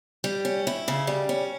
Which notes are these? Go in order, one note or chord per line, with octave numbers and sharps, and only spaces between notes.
G3
C#4
E4
C#3
G3
C#4